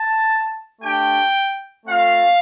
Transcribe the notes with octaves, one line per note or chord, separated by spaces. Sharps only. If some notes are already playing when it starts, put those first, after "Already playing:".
Already playing: A5
A3 D4 G4 G5
A3 C4 F4 F5